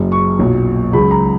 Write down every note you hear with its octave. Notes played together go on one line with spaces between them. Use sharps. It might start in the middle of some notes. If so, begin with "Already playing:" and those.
Already playing: F#1 F#2 C#3
C#6
B1 A#2 F#3
C#2 C#3 F#3 B5
A#5